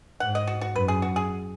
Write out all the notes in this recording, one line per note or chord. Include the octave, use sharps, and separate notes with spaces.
G#2 F#5
D#5
F#4
F#4
F#2 B4
G#4
F#4
G#4